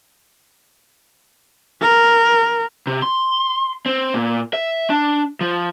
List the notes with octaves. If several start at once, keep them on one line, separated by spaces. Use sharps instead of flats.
A#4
C3
C6
C4
A#2
E5
D4
F3